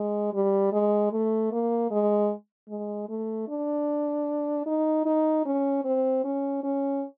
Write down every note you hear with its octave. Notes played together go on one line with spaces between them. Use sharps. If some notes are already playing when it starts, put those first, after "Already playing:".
Already playing: G#3
G3
G#3
A3
A#3
G#3
G#3
A3
D4
D#4
D#4
C#4
C4
C#4
C#4